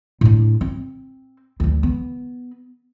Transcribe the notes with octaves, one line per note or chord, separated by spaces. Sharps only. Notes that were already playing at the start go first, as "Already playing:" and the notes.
A2 D4
C4
D2 E3
B3